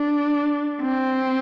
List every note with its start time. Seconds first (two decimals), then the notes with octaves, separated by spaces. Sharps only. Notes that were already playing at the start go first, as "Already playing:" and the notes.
Already playing: D4
0.82 C4